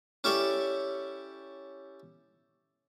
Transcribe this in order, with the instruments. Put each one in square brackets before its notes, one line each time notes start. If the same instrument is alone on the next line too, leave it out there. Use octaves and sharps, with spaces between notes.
[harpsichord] C#4 E4 G4 A4 C#5 D5